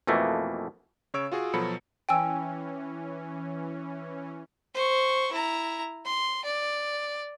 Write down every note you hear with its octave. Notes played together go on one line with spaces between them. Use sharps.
F2 B2 E3 A3 A#3
C#3 C#5 E6 D7
F4 F#4 G#4
B2 F3 F#3 A4 B5 C#7
E3 C#4 G5 G#5 E6
C5 C#6
E4 A#5
C6
D5